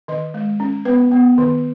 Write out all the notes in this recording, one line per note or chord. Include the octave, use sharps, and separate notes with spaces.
D#3 D#5
G#3
C#4
B3 B4
B3
D#3